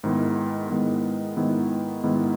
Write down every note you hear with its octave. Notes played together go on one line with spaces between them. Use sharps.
G#2 D#3 G#3 B3 E4
G#2 D#3 G#3 B3 E4
G#2 D#3 G#3 B3 E4
G#2 D#3 G#3 B3 E4